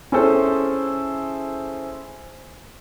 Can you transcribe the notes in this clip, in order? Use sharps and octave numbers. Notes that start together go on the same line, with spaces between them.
C#4 E4 G#4 A4 C5